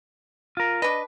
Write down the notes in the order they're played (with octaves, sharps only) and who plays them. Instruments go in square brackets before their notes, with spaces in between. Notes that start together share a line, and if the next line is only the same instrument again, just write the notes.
[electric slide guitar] F4 A#4
[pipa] D4 B4 [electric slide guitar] D#5